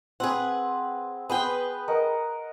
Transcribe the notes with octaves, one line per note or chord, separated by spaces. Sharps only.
C4 G#4 B4 F#5
B3 G#4 B4 G5
A#4 D#5 F#5